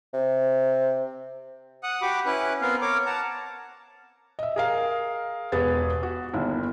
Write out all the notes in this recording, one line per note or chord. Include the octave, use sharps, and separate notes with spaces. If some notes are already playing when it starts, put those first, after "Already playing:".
C3
F#5 D#6 F#6
F#4 G4 B5 D6
C#4 E4 B4 F#6
B3 C4 A#4 F5
A#4 C#5 D6
F#5 A5 A#5
D#5 E5
G#4 A#4 F5
E1 B3 G#4 B4 A6
F#4
G1 D#2 E4